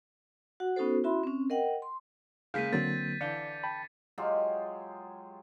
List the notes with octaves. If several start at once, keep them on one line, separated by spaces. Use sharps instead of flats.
F#4 F#5
B3 C#4 D#4 F#4 A4 C5
C#4 E4 F#4 E5 B5 C6
C4 C#4
A#4 D#5 F#5 G5
C6
C#3 G#3 A#3 F5 G6 B6 D#7
D3 F#3 A#3 C4 A6
D3 E3 D5 F5 G6 C#7
G5 A5 B5
F#3 G#3 F4 G4